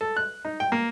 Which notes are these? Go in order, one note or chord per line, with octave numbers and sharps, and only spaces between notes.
A4
F#6
D#4
G5
A#3